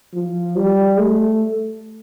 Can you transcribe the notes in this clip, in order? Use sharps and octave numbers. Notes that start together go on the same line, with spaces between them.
F3
G3
A3